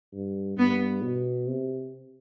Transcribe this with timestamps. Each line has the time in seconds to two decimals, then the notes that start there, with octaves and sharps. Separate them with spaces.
0.13 G2
0.57 G2 B3
1.02 B2
1.48 C3